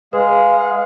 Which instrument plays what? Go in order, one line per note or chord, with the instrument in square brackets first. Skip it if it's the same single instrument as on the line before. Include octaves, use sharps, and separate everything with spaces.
[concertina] G#3 G#4 [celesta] B4 [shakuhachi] F5